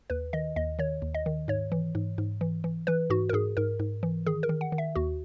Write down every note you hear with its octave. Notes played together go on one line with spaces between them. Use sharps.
D#2 B4
D#3 D#5
D#2 D#5
D#3 C#5
D#2
D#5
D#3
G#2 C#5
E3
G#2
G#2
E3
E3
E3 B4
G#2 F#4
A#4
G#2 G#4
G#2 A#4
G#2
E3
D#3 G#4
A#4
D#3
F#5
D#3
E5
D#2 F#4